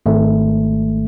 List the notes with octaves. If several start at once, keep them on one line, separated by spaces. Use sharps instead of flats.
G#1 A3